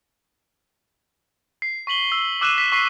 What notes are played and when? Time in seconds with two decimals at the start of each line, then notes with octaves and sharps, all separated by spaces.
1.62 C7
1.87 C#6 B6 F#7 G7
2.12 E6
2.41 D6 E6 F#6 D#7 E7
2.58 B6
2.72 C#6 B6 C7